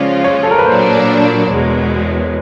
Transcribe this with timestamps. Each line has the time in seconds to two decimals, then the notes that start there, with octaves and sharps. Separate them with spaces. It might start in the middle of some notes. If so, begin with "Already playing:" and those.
Already playing: C#3 F3 G#3 C#4 F4 D5
0.24 C#5
0.43 A4
0.51 A#4
0.58 B4
0.66 A#2 F#3 A#3 D4 C5
1.50 E2 B2 G#3